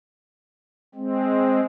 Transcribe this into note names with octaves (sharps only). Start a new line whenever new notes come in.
G#3 C4